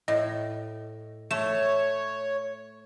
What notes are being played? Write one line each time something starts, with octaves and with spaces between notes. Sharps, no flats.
A2 D#5
A3 C#5 E7